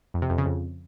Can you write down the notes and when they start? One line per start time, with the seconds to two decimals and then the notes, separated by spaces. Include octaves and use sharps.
0.14 F2
0.22 C3
0.30 F2
0.38 C#3
0.46 F2